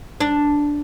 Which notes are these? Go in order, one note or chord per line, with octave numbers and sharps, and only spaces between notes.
D4